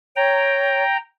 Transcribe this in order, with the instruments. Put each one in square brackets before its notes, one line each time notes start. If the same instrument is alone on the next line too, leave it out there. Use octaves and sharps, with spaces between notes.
[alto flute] C#5 [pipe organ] G5 A#5